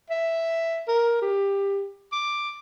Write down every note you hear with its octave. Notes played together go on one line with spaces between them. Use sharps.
E5
A#4
G4
D6